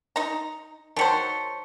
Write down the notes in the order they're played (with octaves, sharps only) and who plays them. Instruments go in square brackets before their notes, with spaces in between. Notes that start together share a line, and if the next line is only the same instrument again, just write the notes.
[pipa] D#4 A#5
[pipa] D#3 F#3 C5 [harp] A5 B6 C#7